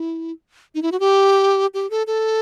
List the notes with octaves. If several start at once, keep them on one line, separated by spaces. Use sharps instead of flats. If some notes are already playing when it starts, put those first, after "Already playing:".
Already playing: E4
D#4
E4
F#4
G4
G4
A4
A4